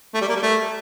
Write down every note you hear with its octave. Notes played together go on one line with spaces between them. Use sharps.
A3
G3
A#3
G3
A3